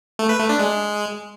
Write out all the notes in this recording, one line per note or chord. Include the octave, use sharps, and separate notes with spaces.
A3
B4
A3
D4
G#3